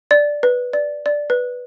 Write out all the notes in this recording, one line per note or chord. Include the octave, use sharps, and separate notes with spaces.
D5
B4
D5
D5
B4